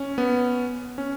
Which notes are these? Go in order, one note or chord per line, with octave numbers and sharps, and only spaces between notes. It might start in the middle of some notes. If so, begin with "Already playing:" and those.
Already playing: C#4
B3
C#4